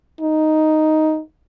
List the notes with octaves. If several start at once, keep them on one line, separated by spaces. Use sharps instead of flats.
D#4